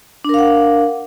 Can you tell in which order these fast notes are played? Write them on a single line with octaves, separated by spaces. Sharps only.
D4 A#4 F5 F#5